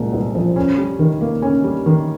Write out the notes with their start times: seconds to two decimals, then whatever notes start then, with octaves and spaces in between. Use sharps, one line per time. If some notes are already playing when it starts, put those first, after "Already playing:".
Already playing: C2 A#2 F3 G#3
0.13 C2
0.35 F3
0.56 C#4
0.78 G3
0.99 D#3
1.21 A#3
1.42 C#4
1.64 G3
1.86 D#3